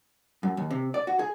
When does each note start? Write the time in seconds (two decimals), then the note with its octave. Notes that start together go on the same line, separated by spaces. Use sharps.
0.43 F#2
0.57 D#2
0.71 C3
0.94 D5
1.07 F#4
1.19 G#4